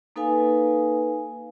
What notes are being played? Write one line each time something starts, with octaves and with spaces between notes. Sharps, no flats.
A#3 D#4 A4 B4 F5 G#5